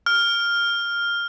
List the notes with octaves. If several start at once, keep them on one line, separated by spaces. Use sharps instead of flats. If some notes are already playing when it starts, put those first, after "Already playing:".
F6